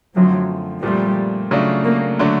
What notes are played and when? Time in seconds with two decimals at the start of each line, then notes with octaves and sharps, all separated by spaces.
0.15 F#2 D3 F3 F#3 A3 C4
0.83 A#2 F3 G3 A3 C4
1.51 C#3 F#3 A3 D4 F4
1.84 A#3
2.19 D3 F#3 A3 D4